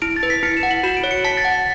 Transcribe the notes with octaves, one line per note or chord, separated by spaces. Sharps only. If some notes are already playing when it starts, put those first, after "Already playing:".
E4 D7
A6
B4
B6
E4 C#7
E7
F#5
F#7
F#4 E7
D7
C#5
C#7
A5 B6
A6
F#5
B6